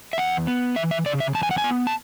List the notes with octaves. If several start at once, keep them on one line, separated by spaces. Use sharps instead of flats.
E5
E2 F#5
B3
E3 E5
E5
C#3 D5
E5
E2 A5
G#5
F#5
G#5
B3
A5